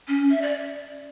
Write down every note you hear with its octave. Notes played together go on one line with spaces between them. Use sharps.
C#4
E5
D5